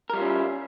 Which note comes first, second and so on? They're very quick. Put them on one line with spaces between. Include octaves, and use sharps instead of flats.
A#4 G3 F4 C#4 E4